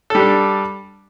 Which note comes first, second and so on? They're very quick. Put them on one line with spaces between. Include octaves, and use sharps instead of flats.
A4 G3 D4